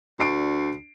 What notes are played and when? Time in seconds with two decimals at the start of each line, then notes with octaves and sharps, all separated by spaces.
0.19 D2 D4 C7 D7